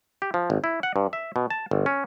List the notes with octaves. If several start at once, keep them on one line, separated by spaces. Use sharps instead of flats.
G4
F3
G#1
E4
F#5
G2
E5
B2
A5
G1
C#4